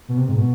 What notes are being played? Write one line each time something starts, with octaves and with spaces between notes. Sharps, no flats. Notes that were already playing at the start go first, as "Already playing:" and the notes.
B2
C3
G#2
B2